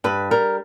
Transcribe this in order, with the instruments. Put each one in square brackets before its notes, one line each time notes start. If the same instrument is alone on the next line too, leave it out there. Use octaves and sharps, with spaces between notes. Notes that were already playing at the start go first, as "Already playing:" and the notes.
[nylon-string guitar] G2 B4
G3 A#4